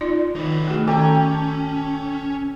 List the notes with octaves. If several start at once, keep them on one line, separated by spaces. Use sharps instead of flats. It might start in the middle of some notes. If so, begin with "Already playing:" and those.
D#4 F4 D5
D#3 D#4 B4
A3 F#4 G#4
D#3 C#4 A4 G5 A#5 D6